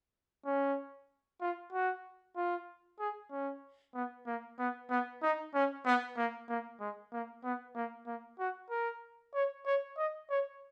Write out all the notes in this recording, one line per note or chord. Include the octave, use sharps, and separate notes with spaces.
C#4
F4
F#4
F4
G#4
C#4
B3
A#3
B3
B3
D#4
C#4
B3
A#3
A#3
G#3
A#3
B3
A#3
A#3
F#4
A#4
C#5
C#5
D#5
C#5